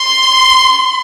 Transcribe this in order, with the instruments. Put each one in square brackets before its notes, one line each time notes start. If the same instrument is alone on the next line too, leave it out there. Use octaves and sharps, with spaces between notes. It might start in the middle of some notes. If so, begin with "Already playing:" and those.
Already playing: [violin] C6